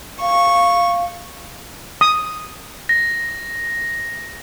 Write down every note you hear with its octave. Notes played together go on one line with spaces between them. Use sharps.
F5 C#6
D#6
A#6